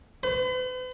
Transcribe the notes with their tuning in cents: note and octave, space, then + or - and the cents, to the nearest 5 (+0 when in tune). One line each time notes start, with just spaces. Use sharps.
B4 +45